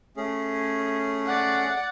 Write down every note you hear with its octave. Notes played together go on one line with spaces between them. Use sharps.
A3 C#4 G#4
D5 F#5